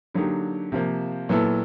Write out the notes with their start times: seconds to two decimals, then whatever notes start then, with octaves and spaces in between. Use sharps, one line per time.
0.14 D3 F#3 A#3 D#4 G4
0.72 C3 F3 A#3
1.29 A#2 F#3 B3 E4 A4